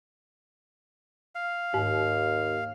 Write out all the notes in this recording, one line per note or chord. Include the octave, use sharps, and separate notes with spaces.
F5
D#2 G#2